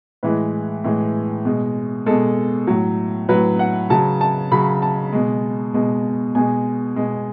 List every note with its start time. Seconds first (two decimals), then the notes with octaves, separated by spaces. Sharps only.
0.23 A2 E3 G#3 B4
0.84 A2 E3 G#3
1.45 B2 G#3
2.06 B2 G#3 A4
2.67 A2 F#3
3.29 A2 F#3 B4
3.59 F#5
3.90 C#3 F#3 A5
4.21 A5
4.52 C#3 F#3 B5
4.82 A5
5.13 B2 G#3
5.74 B2 G#3
6.35 B2 G#3 G#5
6.96 B2 G#3